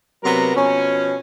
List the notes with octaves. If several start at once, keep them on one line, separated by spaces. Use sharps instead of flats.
C3 F#3 B3 A#4 A#5
B2 F3 C#4